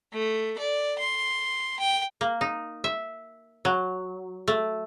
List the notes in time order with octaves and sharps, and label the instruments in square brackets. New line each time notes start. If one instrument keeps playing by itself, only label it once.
[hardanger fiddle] A3
D5
C6
G5
[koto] A#3
D#4
E5
F#3
A3